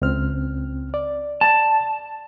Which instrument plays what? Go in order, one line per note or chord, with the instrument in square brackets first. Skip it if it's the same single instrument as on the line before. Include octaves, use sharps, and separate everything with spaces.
[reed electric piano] C#2 C4 F6
D5
[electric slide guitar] A5